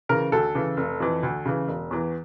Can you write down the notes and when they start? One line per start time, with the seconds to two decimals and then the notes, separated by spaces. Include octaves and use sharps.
0.09 C#3 E3 A#4
0.32 D2 A4
0.55 C#3 E3
0.77 F1
1.00 F2 E3
1.23 D2
1.45 C#3 E3
1.68 E1
1.91 E2 E3